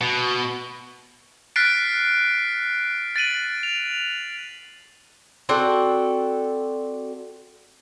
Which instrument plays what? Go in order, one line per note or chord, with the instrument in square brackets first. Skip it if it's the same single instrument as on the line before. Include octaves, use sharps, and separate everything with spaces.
[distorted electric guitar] B2
[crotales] F6 F#6 A6 B6 C7 D7
A6 D7 D#7 F#7
F7
[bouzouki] C4 F#4 A4 D5